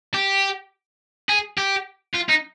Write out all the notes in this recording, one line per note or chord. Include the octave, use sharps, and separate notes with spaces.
G4
G#4
G4
F4
D#4